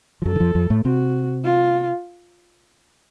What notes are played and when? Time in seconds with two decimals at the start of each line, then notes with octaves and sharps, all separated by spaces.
0.22 F3
0.25 F#2 F#3 A4
0.36 D#3
0.40 F2 F3
0.55 F2 F3
0.70 A2 A3
0.85 C3 C4 F#4
1.44 F4